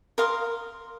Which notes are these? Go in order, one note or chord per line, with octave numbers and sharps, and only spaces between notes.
A#4 F5 C6 D#6